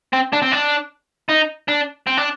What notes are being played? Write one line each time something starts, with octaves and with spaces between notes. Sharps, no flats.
C4
D4
C4
D4
D#4
D4
C4
D4